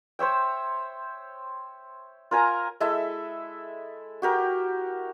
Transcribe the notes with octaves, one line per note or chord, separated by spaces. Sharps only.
C5 C#5 E5 G5
F4 A#4 G#5 A#5
G#3 E4 A4 E5
F#4 G4 A#4